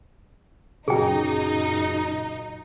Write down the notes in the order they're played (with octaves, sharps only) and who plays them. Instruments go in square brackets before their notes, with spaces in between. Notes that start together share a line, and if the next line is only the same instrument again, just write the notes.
[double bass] F#2 A#2 [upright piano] C#3 F#3 [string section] D#4 [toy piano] G#4 G5